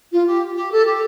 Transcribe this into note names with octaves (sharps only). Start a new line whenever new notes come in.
F4
G4
G4
A4
G4